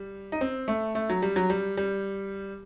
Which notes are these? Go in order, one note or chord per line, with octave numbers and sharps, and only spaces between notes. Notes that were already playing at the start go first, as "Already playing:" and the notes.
Already playing: G3
D#4
C4
A3
A3
F#3
G3
F#3
G3
G3